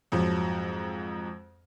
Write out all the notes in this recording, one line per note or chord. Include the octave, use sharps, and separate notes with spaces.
F2 G#2 F3 F#3